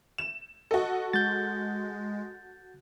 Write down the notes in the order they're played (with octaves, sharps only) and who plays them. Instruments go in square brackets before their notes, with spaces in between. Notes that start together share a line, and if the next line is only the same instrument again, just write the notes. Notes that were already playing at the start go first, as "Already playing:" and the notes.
[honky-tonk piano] E7
[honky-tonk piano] F#4 A4 [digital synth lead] D#5
[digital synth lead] G#3 [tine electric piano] G6 A6